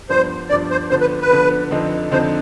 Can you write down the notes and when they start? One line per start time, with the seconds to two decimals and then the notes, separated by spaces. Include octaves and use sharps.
0.09 G2 F3 B3 D4 C5
0.49 G2 F3 B3 D4 D5
0.71 C5
0.90 D3 F3 B3 C5
1.01 B4
1.21 B4
1.31 D3 F3 B3
1.71 F2 D3 F3 C4 D#4
2.11 F2 D3 F3 C4 D#4 C5